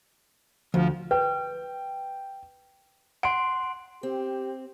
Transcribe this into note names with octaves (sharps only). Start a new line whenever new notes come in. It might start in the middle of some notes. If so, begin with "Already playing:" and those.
D2 F3
B4 G5
F#5 C6 D7
C4 G4